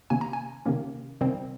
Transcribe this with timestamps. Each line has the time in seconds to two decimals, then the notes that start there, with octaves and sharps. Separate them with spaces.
0.10 C3 D#3 A#3 C#4 G#5
0.21 A#5
0.33 G#5
0.66 C3 D#3 A#3 C#4
1.21 C3 D#3 G3 C4